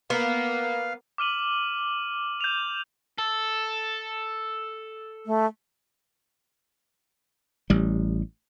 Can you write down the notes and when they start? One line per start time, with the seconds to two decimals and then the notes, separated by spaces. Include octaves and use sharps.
0.10 A#3 B3 F5
1.18 D6 F6 D#7 F#7
2.41 G6 E7 F7
3.19 A4
5.26 A3
7.70 A1 G3